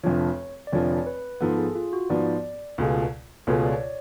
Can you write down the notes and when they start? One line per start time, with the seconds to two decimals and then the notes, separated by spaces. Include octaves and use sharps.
0.04 F1 F2 D3 F3 C#5
0.67 D5
0.72 F1 F2 D3 F3 C#5
1.06 B4
1.41 G#2 F3 B3 A4
1.58 G#4
1.75 F4
1.93 F#4
2.09 G#2 F3 B3 D5
2.78 C#2 B2 A3 F4 G#4
3.47 C#2 B2 A3 F4 G#4 C#5
3.64 D5
3.70 C#5